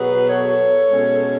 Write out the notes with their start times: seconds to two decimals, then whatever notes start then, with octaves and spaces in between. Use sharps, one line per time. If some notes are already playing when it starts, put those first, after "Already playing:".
Already playing: B2 F#3 B3 G#4 B4
0.29 A4 C#5
0.89 B2 G#3 C#4